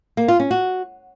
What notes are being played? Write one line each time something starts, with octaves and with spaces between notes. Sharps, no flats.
A#3
F4
C#4
F#4